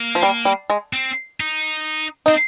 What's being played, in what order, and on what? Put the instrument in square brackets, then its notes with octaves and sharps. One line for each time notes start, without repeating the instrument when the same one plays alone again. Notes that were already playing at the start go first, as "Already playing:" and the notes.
Already playing: [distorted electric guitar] A#3
[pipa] F3
G3
G3
G#3
[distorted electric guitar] C4
D#4
[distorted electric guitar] C4 [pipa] D#4